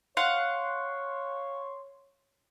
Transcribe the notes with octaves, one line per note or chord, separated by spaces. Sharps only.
C#5 F5 F#5 C6